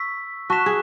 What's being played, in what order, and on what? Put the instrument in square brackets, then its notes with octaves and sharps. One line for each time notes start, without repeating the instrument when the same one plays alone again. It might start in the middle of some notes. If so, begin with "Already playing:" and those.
Already playing: [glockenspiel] C#6 E6 B6
[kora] F#4 [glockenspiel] A5 C#6 F#6 B6 E7
[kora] G#4